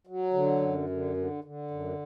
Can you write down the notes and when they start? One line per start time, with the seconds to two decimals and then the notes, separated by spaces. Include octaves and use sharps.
0.07 F#3
0.34 D3
0.61 F#2
0.90 D3
1.17 D3
1.44 D3
1.71 F#2